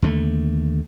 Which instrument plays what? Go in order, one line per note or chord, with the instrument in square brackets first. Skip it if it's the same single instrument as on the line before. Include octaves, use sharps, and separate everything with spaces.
[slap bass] D#2 D3 G#3 A3